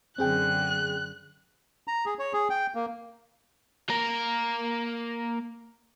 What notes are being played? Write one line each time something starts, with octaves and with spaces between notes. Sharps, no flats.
F#2 D3 C4 G#4 G5 F#6
A#5
G#4
C#5
G#4
G5
A#3
A#3 A#4